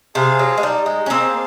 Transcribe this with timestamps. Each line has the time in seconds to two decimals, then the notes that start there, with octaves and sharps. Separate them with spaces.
0.15 C3 G#4 C5 F5 A5
0.39 F#3
0.58 G#3
0.63 G3 D#4
0.86 G#3
1.06 C#4
1.10 A#3 C4 G#4 C5 F5 A5